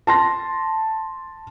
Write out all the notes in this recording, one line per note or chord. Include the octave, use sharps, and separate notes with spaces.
A5 C6 A#6